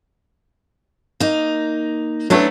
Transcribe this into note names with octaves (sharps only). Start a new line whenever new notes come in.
A#3 D#4
F#3 A3 B3 C#4 D4 E4